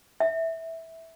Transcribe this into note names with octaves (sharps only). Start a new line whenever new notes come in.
E5